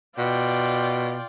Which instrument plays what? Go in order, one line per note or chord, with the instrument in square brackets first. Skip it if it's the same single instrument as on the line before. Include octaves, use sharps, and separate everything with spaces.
[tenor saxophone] B2 [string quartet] F4 D5 G5